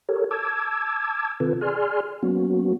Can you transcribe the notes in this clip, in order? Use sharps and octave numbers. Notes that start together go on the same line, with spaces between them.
G4 A4 A#4 C#5
A5 D6 E6 G#6
C3 D#3 C4 F4 A4 B4
G#4 D5 G#5 C6 F6
F#3 A#3 B3 C#4 F#4